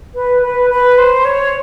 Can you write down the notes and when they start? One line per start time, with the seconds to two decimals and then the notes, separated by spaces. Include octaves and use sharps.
0.15 B4
0.43 B4
0.70 B4
0.98 C5
1.25 C#5